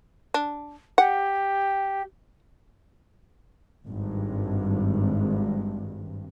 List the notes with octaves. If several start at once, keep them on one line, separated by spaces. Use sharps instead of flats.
D4
G4 F#5
G#1 G2